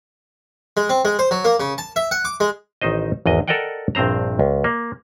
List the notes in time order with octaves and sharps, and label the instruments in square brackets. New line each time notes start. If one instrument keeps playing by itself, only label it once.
[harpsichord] G#3
C4
G#3
C5
F#3
A#3
C#3
A5
E5
F#5
D6
G#3
[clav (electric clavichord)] A1 D#3 D#4 C5 D#5
G#1 E2 D#5
A4 A#4 D5 D#5 F#5 G5
A#1 G2 C4 C5 A#5
C#2
A#3